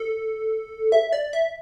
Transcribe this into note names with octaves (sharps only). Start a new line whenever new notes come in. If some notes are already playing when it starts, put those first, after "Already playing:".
Already playing: A4
E5
D5
E5